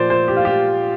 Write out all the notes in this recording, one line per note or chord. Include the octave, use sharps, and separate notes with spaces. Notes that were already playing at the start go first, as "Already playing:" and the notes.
Already playing: A#2 F3 C5 D5
C5
G4
F4
G4